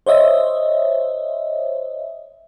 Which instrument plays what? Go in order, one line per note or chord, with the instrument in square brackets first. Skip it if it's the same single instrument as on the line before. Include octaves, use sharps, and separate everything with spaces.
[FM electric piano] C5 C#5 D#5 E5